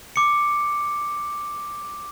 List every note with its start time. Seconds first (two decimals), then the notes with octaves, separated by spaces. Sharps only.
0.16 D6 C#7